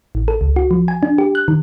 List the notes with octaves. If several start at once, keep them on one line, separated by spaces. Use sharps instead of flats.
A1
A4
C#2
F#4
F3
G#5
D4
G4
F#6
D#3